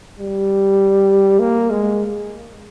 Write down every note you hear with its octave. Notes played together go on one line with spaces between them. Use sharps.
G3
A#3
G#3